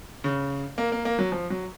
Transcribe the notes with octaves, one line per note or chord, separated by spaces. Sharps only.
C#3
A#3
A#3
A#3
F#3
F3
F#3